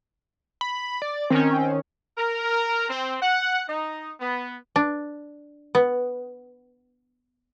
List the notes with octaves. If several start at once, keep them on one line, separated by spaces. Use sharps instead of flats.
B5
D5
D#3 C4 C#4
A#4
C4
F#5
D#4
B3
D4
B3